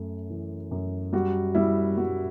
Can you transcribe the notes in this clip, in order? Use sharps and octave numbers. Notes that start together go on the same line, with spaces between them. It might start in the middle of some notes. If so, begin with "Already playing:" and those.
Already playing: F#2 A3
E3
F#2
G3 F#4
G3 E4
G3 F#4